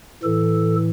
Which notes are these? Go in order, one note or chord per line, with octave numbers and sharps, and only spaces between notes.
A2 E3 A4